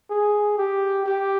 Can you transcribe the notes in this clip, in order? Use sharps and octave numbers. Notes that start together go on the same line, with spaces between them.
G#4
G4
G4